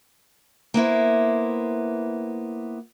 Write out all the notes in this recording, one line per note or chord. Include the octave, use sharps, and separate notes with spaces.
A#3 B3 E4 C5